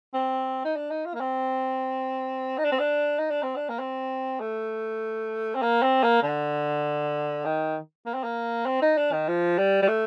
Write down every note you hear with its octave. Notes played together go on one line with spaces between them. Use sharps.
C4
D#4
D4
D#4
F4
A#3
C4
D#4
D4
C4
D4
D#4
D4
C4
D4
A#3
C4
A3
C4
A#3
C4
A#3
D3
D#3
A#3
C4
A#3
C4
D#4
D4
D#3
F3
G3
G3
A3